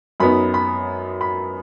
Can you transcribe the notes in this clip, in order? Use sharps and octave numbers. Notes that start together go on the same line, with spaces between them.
F#2 F#3 B3 D#4 B5
B5
B5